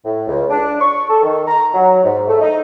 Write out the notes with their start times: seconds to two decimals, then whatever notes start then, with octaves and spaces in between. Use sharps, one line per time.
0.05 A2
0.28 C#2
0.50 D4
0.81 C#6
1.09 A4
1.23 D#3
1.48 A#5
1.74 F#3
2.04 G#2
2.28 A3
2.41 D#4